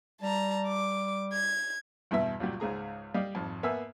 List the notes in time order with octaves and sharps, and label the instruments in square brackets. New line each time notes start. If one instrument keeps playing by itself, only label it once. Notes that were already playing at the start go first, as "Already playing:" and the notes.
[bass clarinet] G3 [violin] A5 A#5
[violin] D6
G#6
[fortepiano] E2 G2 B2 E4 E5
C#2 A#2 F#3 G3
C#2 G#2 G#4 A#5
G3 D5 D#5 F5
G#1 F2
A#3 B3 E5 G#5 E6